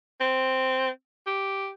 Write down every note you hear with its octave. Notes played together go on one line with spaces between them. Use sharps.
C4
G4